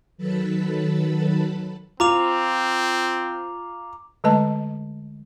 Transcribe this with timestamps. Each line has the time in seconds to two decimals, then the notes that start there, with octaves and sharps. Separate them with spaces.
0.17 D#3 F#3 A4 B4 A5 B5
2.00 C4 F4 A#5 D6 F7
4.24 D3 G#3 A3 B4 D#5 A5